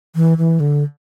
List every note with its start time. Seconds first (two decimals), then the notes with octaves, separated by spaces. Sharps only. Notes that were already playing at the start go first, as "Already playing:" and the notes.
0.16 E3
0.38 E3
0.60 D3